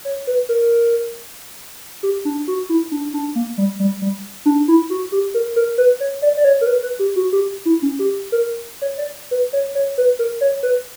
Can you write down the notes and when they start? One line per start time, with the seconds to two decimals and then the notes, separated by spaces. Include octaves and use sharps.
0.05 C#5
0.27 B4
0.49 A#4
2.03 G4
2.25 D4
2.48 F#4
2.69 E4
2.92 D4
3.14 D4
3.35 A#3
3.58 G3
3.80 G3
4.02 G3
4.46 D4
4.68 E4
4.90 F#4
5.12 G4
5.34 A#4
5.56 A#4
5.78 B4
6.00 C#5
6.22 D5
6.37 D5
6.44 C#5
6.61 A#4
6.67 B4
6.83 B4
6.99 G4
7.16 F#4
7.33 G4
7.65 E4
7.82 C#4
7.99 G4
8.32 A#4
8.82 C#5
8.98 D5
9.31 B4
9.53 C#5
9.75 C#5
9.98 B4
10.19 A#4
10.41 C#5
10.63 B4